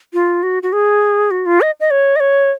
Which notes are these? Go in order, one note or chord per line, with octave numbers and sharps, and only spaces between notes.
F4
F#4
F#4
G#4
F#4
F4
D#5
D#5
C#5
D#5
C#5